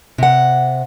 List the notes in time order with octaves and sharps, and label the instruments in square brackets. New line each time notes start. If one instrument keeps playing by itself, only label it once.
[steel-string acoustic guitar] C3 F#5